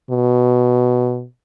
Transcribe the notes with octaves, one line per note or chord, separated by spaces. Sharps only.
B2